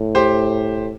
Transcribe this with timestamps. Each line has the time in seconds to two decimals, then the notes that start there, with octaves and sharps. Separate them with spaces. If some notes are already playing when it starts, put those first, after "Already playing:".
Already playing: A2
0.15 G4 C5